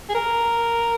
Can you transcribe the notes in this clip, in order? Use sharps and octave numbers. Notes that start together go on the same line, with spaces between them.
G#4
A#4